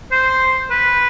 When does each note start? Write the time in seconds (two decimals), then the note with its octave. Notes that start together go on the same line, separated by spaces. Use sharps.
0.11 C5
0.71 B4